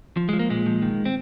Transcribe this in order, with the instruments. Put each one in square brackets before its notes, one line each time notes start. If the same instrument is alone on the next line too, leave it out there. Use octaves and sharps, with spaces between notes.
[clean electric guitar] F3
F3 G#3
A#3
A#2 G#3
F3
D#3
C4